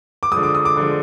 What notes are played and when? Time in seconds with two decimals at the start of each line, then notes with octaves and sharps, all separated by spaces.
0.23 D6
0.32 D3 F3 G#3 D#6
0.43 D6
0.55 D#6
0.65 D6
0.77 D3 F3 G#3